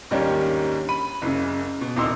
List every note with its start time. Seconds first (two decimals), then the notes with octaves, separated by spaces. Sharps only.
0.11 D#2 G#2 D#3 G3 C#4 D4
0.89 B5 D#7
1.22 F#1 F#2 C#3
1.81 B2
1.97 D#1 C2 D#4 C6 E6